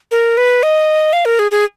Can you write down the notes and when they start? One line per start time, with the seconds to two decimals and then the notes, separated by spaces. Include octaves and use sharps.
0.11 A#4
0.37 B4
0.63 D#5
1.13 F5
1.25 A#4
1.39 G#4
1.51 G#4